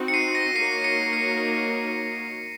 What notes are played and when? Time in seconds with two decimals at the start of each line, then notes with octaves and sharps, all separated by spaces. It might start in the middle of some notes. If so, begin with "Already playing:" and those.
Already playing: C4 D#4 F#4
0.08 C#7
0.14 C7 D#7
0.35 A#6 C#7
0.56 A#3 D#4 F#4 A#4 C#5 C7 D#7
0.84 A#6 C#7
1.13 C7